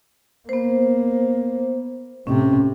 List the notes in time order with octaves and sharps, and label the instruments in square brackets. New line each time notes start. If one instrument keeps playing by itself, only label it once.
[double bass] A#3 [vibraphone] B3 C5
[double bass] A2 C3 [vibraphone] C#4